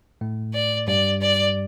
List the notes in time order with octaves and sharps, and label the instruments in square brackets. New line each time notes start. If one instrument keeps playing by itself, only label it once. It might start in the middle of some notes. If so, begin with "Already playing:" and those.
[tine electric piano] A2 A3
[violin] D5
[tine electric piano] G2 G3 [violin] D5
[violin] D5